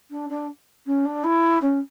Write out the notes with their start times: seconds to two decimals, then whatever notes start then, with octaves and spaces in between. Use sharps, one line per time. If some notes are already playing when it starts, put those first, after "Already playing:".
0.10 D4
0.29 D4
0.86 C#4
1.05 D4
1.24 E4
1.61 C#4